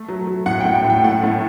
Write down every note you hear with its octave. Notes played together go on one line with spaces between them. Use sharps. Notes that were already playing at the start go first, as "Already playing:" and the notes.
Already playing: A3
F#3
F#3
A2 F#5
A2 G5
G5
A2
G5
A3 F#5
A2